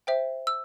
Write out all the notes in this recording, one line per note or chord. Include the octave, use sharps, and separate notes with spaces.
C5 E5 G5
E6